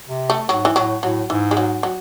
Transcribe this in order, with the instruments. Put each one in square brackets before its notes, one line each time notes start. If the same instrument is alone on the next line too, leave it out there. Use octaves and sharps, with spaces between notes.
[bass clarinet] C3
[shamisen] A3
[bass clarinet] G#2 [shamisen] F#3
[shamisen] E3
[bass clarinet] A2 [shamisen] F#3
[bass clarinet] A2 [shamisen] F#3
[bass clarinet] G#2 [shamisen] E3
[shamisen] G#3
F#3
F#3